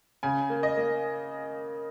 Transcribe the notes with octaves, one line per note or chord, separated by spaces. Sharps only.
C#3 G#5
A#3
D#5
A#3